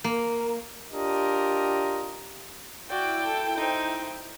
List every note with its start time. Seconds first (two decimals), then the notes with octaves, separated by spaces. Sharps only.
0.04 A#3
0.92 D4 F4 G4 A#4 D#5
2.89 E4 F#4 D5 G5
3.24 A4
3.57 D#4 C5